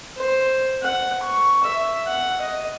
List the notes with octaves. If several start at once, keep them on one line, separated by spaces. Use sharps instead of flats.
C5
F#5
C#6
E5
F#5
D#5